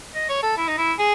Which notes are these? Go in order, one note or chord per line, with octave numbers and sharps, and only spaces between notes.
D#5
C#5
A4
E4
D#4
E4
G#4